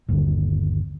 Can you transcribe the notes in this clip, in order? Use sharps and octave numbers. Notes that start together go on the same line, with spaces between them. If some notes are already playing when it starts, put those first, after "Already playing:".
G1 D#2 D3